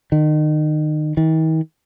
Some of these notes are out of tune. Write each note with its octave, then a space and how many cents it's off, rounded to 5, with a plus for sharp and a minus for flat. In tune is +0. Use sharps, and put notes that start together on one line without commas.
D#3 -30
D#3 +45